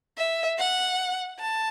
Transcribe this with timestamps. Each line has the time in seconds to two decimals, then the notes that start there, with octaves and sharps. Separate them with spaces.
0.18 E5
0.58 F#5
1.39 A5